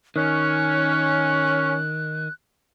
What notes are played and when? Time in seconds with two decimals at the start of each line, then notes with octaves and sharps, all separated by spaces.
0.16 D#3 C#4 F#6